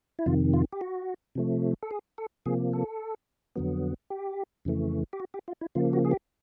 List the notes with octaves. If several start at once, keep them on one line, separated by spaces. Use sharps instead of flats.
E4
F2 C3 D#3 F4
F4
G4
F#4
C3 F3 A3
A4
G#4
A4
C3 F3 A#3 G#4
A4
F2 D3 F#3 B3
G4
F2 C#3 E3 A3
G4
F#4
G4
F4
E4
C#3 F3 A#3 F4
F#4
G#4
G4